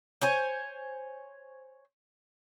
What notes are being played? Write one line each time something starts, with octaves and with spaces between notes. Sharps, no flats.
C5 C#5 G#5